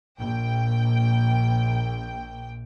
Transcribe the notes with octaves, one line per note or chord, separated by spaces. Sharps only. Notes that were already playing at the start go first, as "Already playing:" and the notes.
A#1 G5